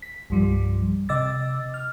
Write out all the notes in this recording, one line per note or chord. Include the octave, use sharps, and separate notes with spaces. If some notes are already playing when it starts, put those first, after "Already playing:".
B6
C2 G2 F3 G3
C3 D#5 D6 E6 A6
F6